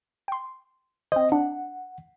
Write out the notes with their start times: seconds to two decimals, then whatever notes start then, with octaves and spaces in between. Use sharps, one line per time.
0.28 G5 C6
1.12 C4 C5 D#5
1.32 D4 F#5